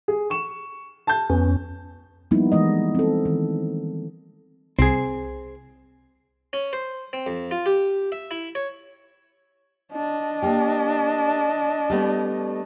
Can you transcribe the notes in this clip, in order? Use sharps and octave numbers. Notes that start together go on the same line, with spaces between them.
G#4
C#6 E7
A5 G6
F2 B3 C#4
F3 G3 A#3 B3 D#4 E4
E3 G#3 D#5
C4 A4
D#3 E3
C2 C4 G#4
C#4
C5
C4
F2
F4
G4
E5
E4
C#5
D4 D#5
A#3 G4
G3 A3 B3